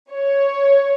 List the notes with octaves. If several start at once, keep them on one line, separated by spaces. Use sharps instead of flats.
C#5